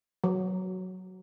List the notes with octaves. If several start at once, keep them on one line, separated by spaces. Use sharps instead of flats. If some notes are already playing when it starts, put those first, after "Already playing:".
F#3